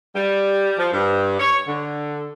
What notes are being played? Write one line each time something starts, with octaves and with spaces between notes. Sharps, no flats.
G3
F3
G2
C#5
D3